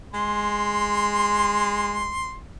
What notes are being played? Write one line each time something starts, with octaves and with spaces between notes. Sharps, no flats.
G#3 C6